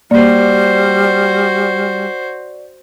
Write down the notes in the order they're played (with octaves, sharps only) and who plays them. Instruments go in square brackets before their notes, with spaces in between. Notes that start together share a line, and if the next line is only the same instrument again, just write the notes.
[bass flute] G3 [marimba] A#3 [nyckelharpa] F#4 C5 [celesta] D5